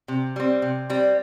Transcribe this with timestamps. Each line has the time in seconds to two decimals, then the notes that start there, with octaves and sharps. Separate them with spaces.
0.08 C3
0.36 G3 C4
0.62 C3
0.90 G3 C4